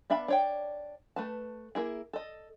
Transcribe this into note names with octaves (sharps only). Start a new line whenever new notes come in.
B3 D4 E5 F5 B5
D4 C#5 G5
A3 B4 A5
A#3 E4 G#4
A4 D#5